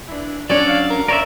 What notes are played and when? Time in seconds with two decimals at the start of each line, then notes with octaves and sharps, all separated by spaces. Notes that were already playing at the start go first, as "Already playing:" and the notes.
0.09 E3 D4 E4
0.50 F#3 C#4 D4 C#5 D5
0.68 F5
0.90 A#4
1.08 A#4 C#5 D5 E5